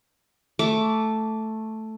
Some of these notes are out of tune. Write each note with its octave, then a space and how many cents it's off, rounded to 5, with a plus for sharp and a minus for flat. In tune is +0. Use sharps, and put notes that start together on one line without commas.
A3 +0 D6 -20